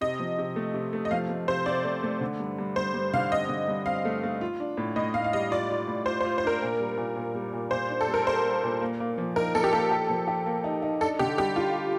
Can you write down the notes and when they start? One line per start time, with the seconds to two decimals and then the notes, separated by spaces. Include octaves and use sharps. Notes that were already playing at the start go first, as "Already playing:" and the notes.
0.01 C3 D#5
0.20 F3
0.38 C3
0.56 A3
0.74 C3
0.93 A3
1.05 D#5
1.11 F3 F5
1.29 A3
1.48 C3 C5
1.66 C3 D5
1.84 A3
2.03 A3
2.21 D3
2.40 G2
2.59 G2
2.76 G2 C5
2.94 G2
3.14 D3 F5
3.31 C4 D#5
3.49 D3
3.68 G2
3.86 C4 F5
4.05 A3
4.23 A3
4.41 F4
4.60 D4
4.77 A2
4.96 A2 D#5
5.14 A2 F5
5.24 F5
5.33 G3 D#5
5.51 F4 D5
5.70 F4
5.88 A2
6.06 F4 C5
6.21 C5
6.25 F4
6.38 C5
6.44 D4 A#4
6.62 A#2
6.80 G3
6.97 A#2
7.16 A#2
7.35 G3
7.53 A#2
7.71 A#2 C5
7.90 D4
8.01 A4
8.08 G3
8.14 A#4
8.26 G3 C5
8.44 G3
8.63 A#2
8.81 A#3
9.00 A#3
9.18 F3
9.36 D#4 A#4
9.55 F3 A4
9.64 G4
9.73 A#3 A4
9.91 G4
10.10 F3
10.28 G4
10.46 A#3
10.64 D#4
10.82 D#4
11.01 D4 A4
11.19 D3 G4
11.38 G3 G4
11.56 G3 F4